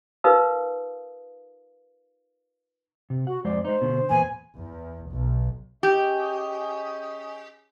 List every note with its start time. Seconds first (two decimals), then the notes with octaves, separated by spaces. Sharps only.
0.24 D#4 F4 A#4 B4 F5 D#6
3.10 C3
3.27 F#4 F#5
3.45 F2 G#3 C5 D5
3.65 G#3 D#4 C5
3.81 B2 D3
4.10 E2 A#2 B4 G#5
4.56 E2
5.12 B1
5.83 C#4 G4 G#4 D#5